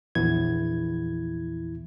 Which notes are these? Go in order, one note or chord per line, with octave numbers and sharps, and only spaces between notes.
A#1 E2 E4 G#6